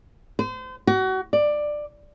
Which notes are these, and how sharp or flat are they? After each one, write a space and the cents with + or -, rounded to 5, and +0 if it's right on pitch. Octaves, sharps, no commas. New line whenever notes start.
C5 -35
F#4 +30
D5 +15